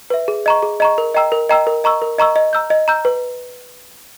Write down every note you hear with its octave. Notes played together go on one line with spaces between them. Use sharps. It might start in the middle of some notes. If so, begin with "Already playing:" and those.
B4 E5
G#4
D#5 A#5 C#6
G#4
D#5 A#5 C#6
A#4
D#5 G5 A#5 E6
A#4
D#5 G5 A#5 E6
A#4
D#5 A#5 C#6 E6
A#4
D#5 A#5 C#6 E6
D#5
A#5 E6 G6
D#5
A#5 E6 G6
B4